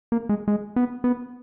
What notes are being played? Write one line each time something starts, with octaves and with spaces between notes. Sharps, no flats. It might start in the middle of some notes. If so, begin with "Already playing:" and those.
A#3
G#3
G#3
B3
B3